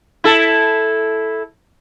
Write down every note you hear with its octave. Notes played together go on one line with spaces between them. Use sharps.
E4 A4